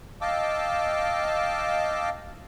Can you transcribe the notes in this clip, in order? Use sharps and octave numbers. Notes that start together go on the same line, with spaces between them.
D#5 F5 G5 A5 D6 E6